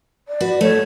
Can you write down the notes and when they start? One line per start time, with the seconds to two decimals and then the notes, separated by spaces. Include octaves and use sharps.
0.28 D5
0.40 F#4 B4
0.61 A3 C#5